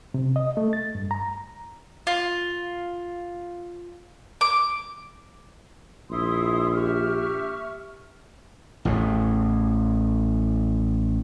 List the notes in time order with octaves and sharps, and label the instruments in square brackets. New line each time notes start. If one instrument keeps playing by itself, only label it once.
[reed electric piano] C3
D#5
A3
A6
G2
A#5
[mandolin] F4
D6
[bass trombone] A#1 [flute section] E4 C6 D#6
[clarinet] G4 [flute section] E5 C#6 F6
[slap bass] A1 E2 A2